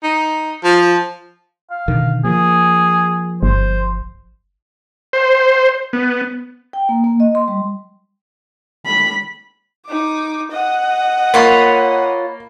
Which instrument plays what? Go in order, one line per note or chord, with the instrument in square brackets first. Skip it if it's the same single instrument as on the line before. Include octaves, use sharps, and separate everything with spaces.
[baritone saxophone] D#4
F3
[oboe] F5
[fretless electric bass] B2 D3 D#3
[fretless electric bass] F3 A#3 [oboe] G#4
[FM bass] G1 [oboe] C5
[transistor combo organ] C5
B3
[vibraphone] G5
A#3
A#3
D#5
C6
G3
[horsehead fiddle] B5
[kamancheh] D#4 D6
D#5 F#5
[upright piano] A#3 [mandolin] F4 C#5 B5